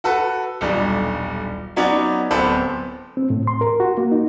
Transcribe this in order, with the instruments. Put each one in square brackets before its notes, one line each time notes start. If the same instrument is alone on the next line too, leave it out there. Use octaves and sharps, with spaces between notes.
[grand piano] F#4 A4 B4
D#1 B1 G3 D4
F#3 B3 C#4 D#4 F#4 D5
D1 B3 C4 A4 C5 B5
[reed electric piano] C4
A2
C6
A#4
F#4
A#3
D#4